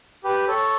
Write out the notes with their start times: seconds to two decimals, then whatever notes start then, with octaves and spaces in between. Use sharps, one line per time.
0.24 G4 B4
0.48 A4 C#5